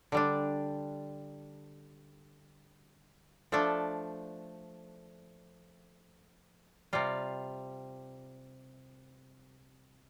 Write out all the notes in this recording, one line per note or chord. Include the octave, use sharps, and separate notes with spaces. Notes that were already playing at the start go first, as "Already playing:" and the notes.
D3 G3 D4
F3 A3 D4 A4
C3 G3 F4